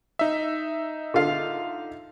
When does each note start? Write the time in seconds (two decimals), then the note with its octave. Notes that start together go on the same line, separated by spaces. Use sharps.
0.19 D#4 E5
1.14 D3 F4 F5